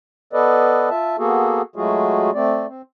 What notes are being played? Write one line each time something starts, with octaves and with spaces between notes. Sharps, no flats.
B3 A4 B4 D5 D#5
F4 E5 A5
A#3 B3 F#4 G#4 A4
F#3 G#3 A3 F4 F#4 G#4
A3 C4 D5
C4